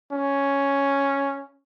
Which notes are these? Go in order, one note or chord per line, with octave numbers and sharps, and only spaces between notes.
C#4